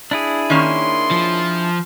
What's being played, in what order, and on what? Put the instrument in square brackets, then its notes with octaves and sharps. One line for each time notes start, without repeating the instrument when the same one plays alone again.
[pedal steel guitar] D4 E4 G#4
[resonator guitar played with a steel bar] D#3 A#3 C#4 [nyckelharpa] C6
[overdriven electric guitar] F3